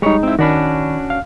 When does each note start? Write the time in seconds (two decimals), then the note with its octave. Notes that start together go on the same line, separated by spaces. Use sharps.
0.02 G3 G#3 D#4 C#5
0.23 C4 E4
0.39 D#3 C#4 D4 F#4 D5 B5
1.10 F5